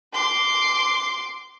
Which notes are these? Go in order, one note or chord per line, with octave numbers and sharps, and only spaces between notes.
C6 D6